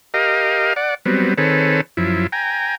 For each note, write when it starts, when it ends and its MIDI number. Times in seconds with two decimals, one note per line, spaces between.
0.14 0.73 67
0.14 0.73 70
0.14 0.73 75
0.14 0.73 77
0.76 0.94 74
0.76 0.94 78
1.06 1.34 54
1.06 1.34 55
1.06 1.34 59
1.06 1.34 60
1.38 1.81 51
1.38 1.81 60
1.38 1.81 68
1.38 1.81 69
1.38 1.81 71
1.38 1.81 73
1.97 2.27 42
1.97 2.27 53
1.97 2.27 64
2.32 2.75 79
2.32 2.75 80
2.32 2.75 82